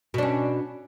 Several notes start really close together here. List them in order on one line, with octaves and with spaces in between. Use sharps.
B2 D4 C#4